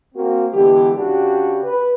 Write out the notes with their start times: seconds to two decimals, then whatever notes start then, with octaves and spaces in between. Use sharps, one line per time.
0.15 A#3 C4 F#4
0.53 D3 E3 G#3 B3 G4
0.97 C#3 D4 F#4 G4
1.64 B4